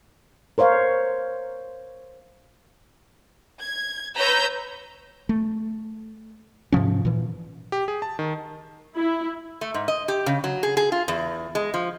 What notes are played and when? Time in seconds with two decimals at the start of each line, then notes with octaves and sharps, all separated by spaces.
0.58 A#4 C5 C#5 F5
3.61 G#6
4.17 B4 C#5 A#5 E6 G6
5.29 A3
6.72 G#2 C3 F3 C#4
7.05 A#2 E3
7.72 G4
7.88 G#4
8.02 A5
8.19 D#3
8.96 E4
9.61 A3
9.74 G#2
9.88 D#5
10.08 G4
10.26 C#3
10.44 F#3
10.63 G#4
10.77 G#4
10.92 F4
11.08 E2
11.55 G#3
11.74 F3